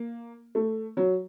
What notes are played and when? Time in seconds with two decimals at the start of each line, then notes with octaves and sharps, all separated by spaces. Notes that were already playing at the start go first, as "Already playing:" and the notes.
Already playing: A#3
0.55 A3
0.97 F#3